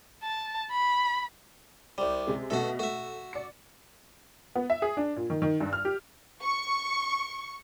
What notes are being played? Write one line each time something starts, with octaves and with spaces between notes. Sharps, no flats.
A5
B5
C2 G3 C5
C3 G#3
B2 A3 F#4 A4 E5
A3 F#4 E5
D5 C#7
B3
E5
G#4
D4
A#2
D#3
D#3
G2
F6
G4
C#6